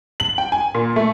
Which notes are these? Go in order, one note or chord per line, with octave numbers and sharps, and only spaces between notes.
F#7
G5
G#5
A#2
A3